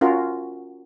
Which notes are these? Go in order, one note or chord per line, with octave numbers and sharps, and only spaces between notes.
C#4 F4 F#4 A#4